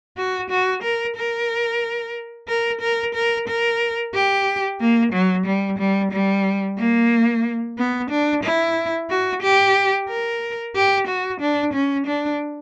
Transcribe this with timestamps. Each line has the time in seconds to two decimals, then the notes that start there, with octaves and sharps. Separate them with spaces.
0.17 F#4
0.50 F#4
0.83 A#4
1.16 A#4
2.48 A#4
2.81 A#4
3.15 A#4
3.48 A#4
4.13 G4
4.80 A#3
5.12 F#3
5.46 G3
5.78 G3
6.12 G3
6.78 A#3
7.78 B3
8.10 D4
8.43 E4
9.10 F#4
9.42 G4
10.09 A#4
10.75 G4
11.07 F#4
11.41 D4
11.73 C#4
12.07 D4